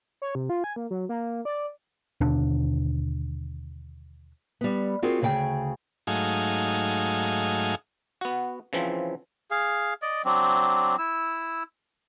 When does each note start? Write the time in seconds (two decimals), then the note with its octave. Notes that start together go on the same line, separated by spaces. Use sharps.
0.22 C#5
0.35 C3
0.50 F4
0.64 G#5
0.76 A#3
0.91 F#3
1.09 A#3
1.45 D5
2.21 D#2 B2 D3 D4
4.61 G3 B3
5.02 C4 F4 F#4 G#4 A#4
5.22 D2 C#3 G#4 G5
6.07 G#2 F#3 A3 D#4 F5 G#5
8.21 B3 F#4
8.73 C#3 E3 F3 C4
9.51 G#4 F5
10.02 D5 D#5
10.25 F#3 C4 D4
10.98 E4 E6